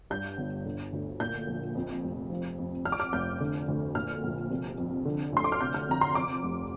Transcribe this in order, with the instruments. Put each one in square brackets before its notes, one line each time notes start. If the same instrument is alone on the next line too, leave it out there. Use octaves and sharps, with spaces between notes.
[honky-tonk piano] G2 G6
G1
D3
D2
A#2 G6
A#1
F2
F1
F3
F2
F2 F6
D6
F6
F1 G6
D3
D2
A#2 F6
A#1
C3
F2
D3
D2 C6
D6
F6
C3 G6
F6
F2 A#5
C6
F2 D6
F1